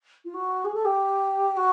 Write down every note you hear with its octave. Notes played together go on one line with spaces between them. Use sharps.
F4
F#4
G#4
A4
G4
F#4